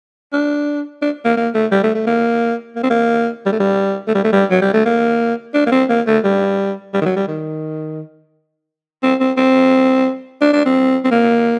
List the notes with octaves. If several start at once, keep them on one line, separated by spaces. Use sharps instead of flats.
D4
D4
A#3
A#3
A3
G3
A3
A3
A#3
A#3
C4
A#3
G3
A3
G3
A3
G3
A3
G3
F#3
G3
A3
A#3
D4
A#3
C4
A#3
A3
G3
G3
D#3
F#3
G3
D#3
C4
C4
C4
D4
D4
C4
C4
A#3